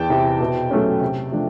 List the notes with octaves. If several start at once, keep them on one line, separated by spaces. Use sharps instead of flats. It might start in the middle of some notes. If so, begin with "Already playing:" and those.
Already playing: E2 G5 A5
C3 E3
B2
F#3 A3 C#4
C3
F3 A3 D4